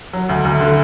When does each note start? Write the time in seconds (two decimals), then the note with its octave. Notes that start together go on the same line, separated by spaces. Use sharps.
0.13 F#3
0.29 D2
0.45 D2
0.61 D3